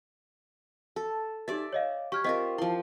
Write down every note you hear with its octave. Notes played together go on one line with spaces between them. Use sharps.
A4
D#4 G4 D5 E5 A6
C#5 D#5 F5
G4 C#6 F6 G#6
C4 F4 A#4 D#5 C#6 B6
F3 E4 C6